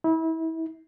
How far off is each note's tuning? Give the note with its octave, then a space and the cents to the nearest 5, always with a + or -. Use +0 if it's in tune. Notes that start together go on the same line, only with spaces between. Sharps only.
E4 -30